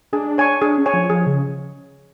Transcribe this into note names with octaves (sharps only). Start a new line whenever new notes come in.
D4 G#4
C#5 G#5 C#6
D4 G#4
C#4
C#5 G#5 C#6
F3
F3 G#4
C#3